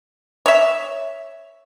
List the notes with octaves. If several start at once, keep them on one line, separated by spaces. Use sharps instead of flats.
C#5 E5